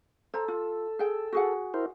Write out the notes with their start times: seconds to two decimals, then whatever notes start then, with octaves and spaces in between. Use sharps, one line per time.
0.34 A4 C5 A#5
0.48 F4
0.99 G#4 G5
1.33 F#4 G#4 F#5
1.74 E4 A#4 C5